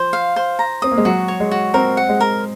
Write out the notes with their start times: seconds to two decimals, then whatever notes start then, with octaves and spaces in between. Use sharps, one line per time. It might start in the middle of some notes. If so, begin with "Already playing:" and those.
Already playing: F3 C5
0.13 F5
0.36 C5
0.59 A#5
0.82 C4 D#6
0.92 A#3
0.98 G#3
1.05 F#3 F#4
1.28 C#5
1.40 G#3
1.51 F#4
1.74 C4 A#4
1.97 F#5
2.09 G#3
2.20 A#4